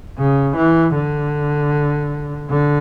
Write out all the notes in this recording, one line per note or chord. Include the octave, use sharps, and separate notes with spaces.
C#3
E3
D3
D3